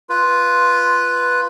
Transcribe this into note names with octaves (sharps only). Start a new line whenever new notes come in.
F4 B4